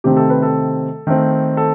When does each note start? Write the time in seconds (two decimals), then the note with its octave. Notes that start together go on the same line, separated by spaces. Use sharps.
0.04 C3 D#3 A3 C4 G4
0.17 A4
0.30 B4
0.43 A4
1.07 D#3 A3 C4
1.57 A4